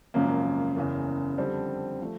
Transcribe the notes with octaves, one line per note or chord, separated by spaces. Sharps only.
G#1 F#2 C#3 F3 A#3
F#1 E2 C#3
F2 D3 G3 C4
F3 A3